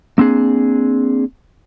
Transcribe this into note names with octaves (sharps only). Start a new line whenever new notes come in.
A#3 C4 D4 G#4